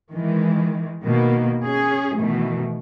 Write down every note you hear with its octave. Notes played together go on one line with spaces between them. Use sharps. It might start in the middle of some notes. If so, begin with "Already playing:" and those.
D#3 E3 G#3
B2 D#3 A#3
C#4 G#4
B2 D#3 E3 A3